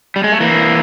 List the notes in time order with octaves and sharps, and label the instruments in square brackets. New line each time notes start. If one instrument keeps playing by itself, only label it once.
[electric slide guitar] G3
G#3
A3
E3 A#3